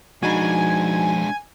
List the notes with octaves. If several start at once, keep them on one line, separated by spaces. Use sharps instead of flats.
F3 G#3 D4 D#4 F#4 G#5 B5